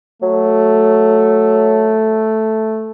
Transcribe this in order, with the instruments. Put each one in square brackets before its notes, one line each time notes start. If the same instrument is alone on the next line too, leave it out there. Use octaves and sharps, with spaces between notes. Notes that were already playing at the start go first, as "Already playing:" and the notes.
[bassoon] F#3 [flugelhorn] A3